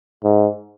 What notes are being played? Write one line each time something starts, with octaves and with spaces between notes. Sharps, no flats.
G#2